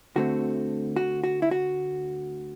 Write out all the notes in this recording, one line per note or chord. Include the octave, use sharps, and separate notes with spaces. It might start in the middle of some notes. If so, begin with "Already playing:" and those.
D2 D3 A3 C4 F#4
F#4
F#4
E4
F#4